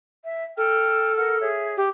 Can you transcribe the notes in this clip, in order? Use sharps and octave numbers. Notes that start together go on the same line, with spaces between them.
E5
A4 G5 F6
A#4 F#5 F6
G#4 C#5 E5
G4